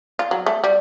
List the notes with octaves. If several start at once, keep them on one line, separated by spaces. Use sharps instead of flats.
F4
F#3
A3
G3